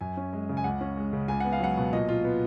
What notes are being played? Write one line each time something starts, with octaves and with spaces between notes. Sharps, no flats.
F#2 G#5
C#4
G#3
C#3
G#5
C#2 F#5
C#4
G#3
C#3
C#2 G#5
B3 F#5
F5
F#3 F#5
B2
A#2 D#5
F4
B3